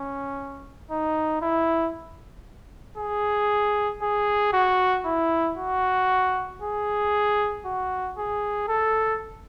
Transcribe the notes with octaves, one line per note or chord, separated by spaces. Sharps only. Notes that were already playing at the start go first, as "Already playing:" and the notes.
Already playing: C#4
D#4
E4
G#4
G#4
F#4
E4
F#4
G#4
F#4
G#4
A4